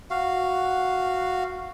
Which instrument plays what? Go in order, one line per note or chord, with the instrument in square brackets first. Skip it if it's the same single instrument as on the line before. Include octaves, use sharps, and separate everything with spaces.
[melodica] F#4 F5